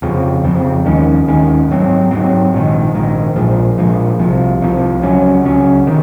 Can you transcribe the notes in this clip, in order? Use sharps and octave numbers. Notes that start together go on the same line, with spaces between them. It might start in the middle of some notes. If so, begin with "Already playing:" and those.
F2 C#3 F3 C4
F2 C#3 F3 C4
D#2 D#3 G#3 C#4
D#2 D#3 G#3 C#4
G#2 F#3 C4
G#2 F#3 C4
A#1 G#2 D#3
A#1 G#2 D#3
A#1 A#2 F3 G#3
A#1 A#2 F3 G#3
C2 C3 F3
C2 C3 F3
C#2 C#3 F#3 C#4
C#2 C#3 F#3 C#4
C3 D#3